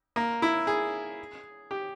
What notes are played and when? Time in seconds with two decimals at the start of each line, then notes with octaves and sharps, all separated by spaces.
0.16 A#3
0.42 E4
0.67 G#4
1.71 G4